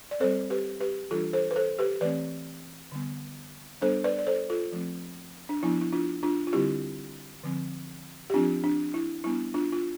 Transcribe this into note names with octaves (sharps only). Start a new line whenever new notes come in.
D5
G3 C4 A4 C5
G4 B4
G4 B4
E3 G3 D4 F4 A4
A4 C5
B4
A4 C5
G4 B4
E3 A3 C4 B4 D5
D3 G3 B3
G3 B3 D4 A4 C5
B4 D5
D5
A4 C5
F4 A4
F3 A3 C4
D4
F3 B3 D4 E4
E4
D4 F4
D4 F4
F4
D3 G3 C4 E4 G4
D3 F3 C4
G4
F3 C4 D4 F4
D4
E4
G3 B3 D4 E4
D4 F4
F4